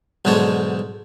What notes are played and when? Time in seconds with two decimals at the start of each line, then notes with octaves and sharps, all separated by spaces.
0.25 B1 G#2 D3 G#3 D4 C#5